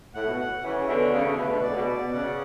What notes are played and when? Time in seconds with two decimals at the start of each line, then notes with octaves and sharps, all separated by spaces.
0.14 A2 F#5
0.27 B2
0.40 F#5
0.63 C#3 E3 C#4
0.78 C#3
0.88 B2 D3 B4
1.14 C#3 A3
1.26 B2 D3
1.38 B2 D3 B4
1.50 B2
1.63 A2 D5
1.70 C#3
1.76 B2
1.88 D5
2.01 B2
2.13 C#3 F#5